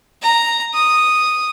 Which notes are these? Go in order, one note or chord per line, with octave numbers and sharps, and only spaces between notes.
A#5
D#6